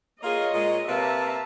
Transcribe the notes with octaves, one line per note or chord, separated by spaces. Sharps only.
A#3 F4 G#4 C#5 D#5
A#2 G#3
C3 A#3 B4 E5 A5 A#5